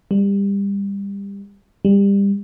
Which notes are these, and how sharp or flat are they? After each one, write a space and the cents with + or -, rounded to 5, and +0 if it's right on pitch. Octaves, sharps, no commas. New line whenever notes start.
G3 +25
G3 +25